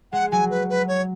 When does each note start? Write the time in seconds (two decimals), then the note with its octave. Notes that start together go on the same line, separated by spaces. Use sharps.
0.13 G#3 F#5
0.31 F#3 G#5
0.50 B4
0.70 B4
0.88 C#5